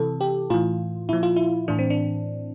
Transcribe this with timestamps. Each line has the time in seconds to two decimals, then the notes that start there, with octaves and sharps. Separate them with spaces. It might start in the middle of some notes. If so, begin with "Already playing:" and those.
Already playing: C3 E3 A4
0.21 G4
0.50 A2 E3 F4
1.09 A#2 F3 E4
1.23 F4
1.36 E4
1.68 A2 E3 D4
1.79 C4
1.90 D4